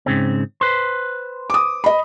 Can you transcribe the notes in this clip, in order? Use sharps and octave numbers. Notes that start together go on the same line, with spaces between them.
G#2 C#3 C4
B4 C5
D6 D#6
D#5 B5